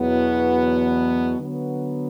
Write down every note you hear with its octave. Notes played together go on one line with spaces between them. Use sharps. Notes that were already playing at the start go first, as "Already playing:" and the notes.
Already playing: E2 B2 F#3 B3
D3 F#3 B3